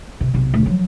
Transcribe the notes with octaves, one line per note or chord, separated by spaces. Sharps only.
C3
B1 C3
D2 B2
F3 F#3